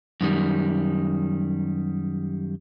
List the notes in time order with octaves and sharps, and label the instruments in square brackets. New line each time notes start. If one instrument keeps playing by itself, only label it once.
[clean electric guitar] F#2 D#3 G3